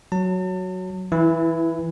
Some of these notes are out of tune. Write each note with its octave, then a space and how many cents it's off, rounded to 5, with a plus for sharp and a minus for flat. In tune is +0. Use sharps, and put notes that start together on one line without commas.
F#3 +0 A5 +40
E3 -10 E4 +15